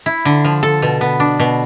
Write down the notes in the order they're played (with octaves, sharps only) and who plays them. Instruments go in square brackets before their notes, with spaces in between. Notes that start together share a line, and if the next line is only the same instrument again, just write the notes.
[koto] E4
D3
F3
A4
B2
B3
D4
B2